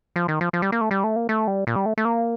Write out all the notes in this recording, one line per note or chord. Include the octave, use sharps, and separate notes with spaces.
F3
D#3
F3
F3
G3
A#3
A3
G3
A3
A#3
A3
G3
A#2
G3
A3
A3
A#3